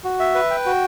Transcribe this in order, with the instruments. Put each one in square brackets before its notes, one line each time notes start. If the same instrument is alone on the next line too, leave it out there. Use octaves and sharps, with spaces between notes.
[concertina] F#4
E5
B4
G5
F#4